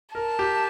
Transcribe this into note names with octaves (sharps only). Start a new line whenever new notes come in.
A#4 A5
G4